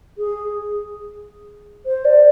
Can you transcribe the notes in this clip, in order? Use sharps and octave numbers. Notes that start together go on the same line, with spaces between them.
G#4
C5
D5